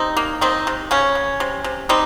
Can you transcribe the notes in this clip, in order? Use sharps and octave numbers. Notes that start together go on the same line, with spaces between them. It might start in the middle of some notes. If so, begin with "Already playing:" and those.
Already playing: G3 C4 D#4
A#3
D#3 C4 D#4
C3
C#3 C#4
C#3
C3
C3
G3 C4 D#4